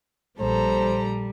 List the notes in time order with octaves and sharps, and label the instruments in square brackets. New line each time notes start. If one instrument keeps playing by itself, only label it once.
[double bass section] A#1 [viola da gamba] G3 [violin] A4 A#5 [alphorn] C5